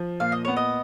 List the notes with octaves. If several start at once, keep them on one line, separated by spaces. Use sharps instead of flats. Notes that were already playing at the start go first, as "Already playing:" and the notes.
Already playing: F3
A#2 F5
D#5
B3 C#5
D#5